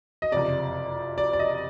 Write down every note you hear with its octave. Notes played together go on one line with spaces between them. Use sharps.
D#5
F#1 F2 C3 D5
D5
D5
D#5